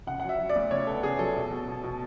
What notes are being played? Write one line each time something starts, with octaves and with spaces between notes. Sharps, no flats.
C#3 F#5
F#3 F#5
E5
F#3
D5
D2
C#3 C#5
B3 A4
C#3 G#4
F#3 A4
B2
B2
B2
B2